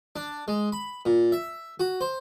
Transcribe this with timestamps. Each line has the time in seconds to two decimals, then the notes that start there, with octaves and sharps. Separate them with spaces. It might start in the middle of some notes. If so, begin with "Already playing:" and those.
0.16 D4
0.48 G#3
0.72 B5
1.06 A#2
1.32 E5
1.80 F#4
2.01 C5